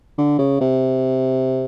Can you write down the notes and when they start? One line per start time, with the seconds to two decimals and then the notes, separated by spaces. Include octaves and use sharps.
0.18 D3
0.39 C#3
0.61 C3